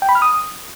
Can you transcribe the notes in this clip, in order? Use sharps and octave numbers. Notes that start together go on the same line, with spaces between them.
G5
B5
F6
D#6